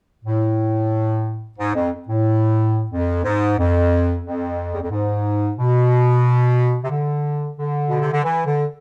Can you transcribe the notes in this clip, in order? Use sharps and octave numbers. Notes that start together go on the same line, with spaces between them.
A2
G#2
F2
A2
F2
G#2
F2
F2
E2
F2
G#2
B2
C3
D3
D3
B2
C3
D3
E3
D3